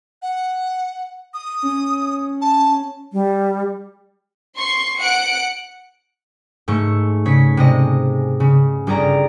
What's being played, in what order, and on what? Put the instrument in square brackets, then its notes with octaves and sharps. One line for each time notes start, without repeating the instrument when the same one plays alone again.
[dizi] F#5
D#6
[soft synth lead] C#4
[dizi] A5
[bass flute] G3
[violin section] C6 C#6 C7
F#5 F#6 C#7 D7
[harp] G#2 A3 C#6
C#3 C#5 B6
C3 G#3 D#5
C#3
G1 G3 G#4 D5 A#5